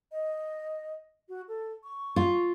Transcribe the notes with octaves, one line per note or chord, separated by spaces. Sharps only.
D#5
F#4
A4
C#6
F4